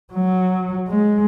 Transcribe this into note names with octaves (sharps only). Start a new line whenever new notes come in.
F#3
G#3